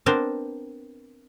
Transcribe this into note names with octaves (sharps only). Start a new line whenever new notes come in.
B3 C4 D4 A#4 C5